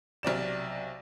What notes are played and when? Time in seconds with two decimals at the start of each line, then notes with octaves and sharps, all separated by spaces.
0.23 B1 C3 D5 E7